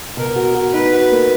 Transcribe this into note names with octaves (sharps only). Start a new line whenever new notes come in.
B2 A#4
F#4
F#4
D#4 B4
F#4
A#3